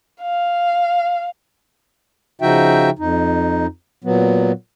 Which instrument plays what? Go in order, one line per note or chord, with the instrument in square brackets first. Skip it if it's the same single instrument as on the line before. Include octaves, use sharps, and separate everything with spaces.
[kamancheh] F5
[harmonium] C#3 F3 D#4 F#4 E5 G5
F2 D#4
A#2 F#3 B3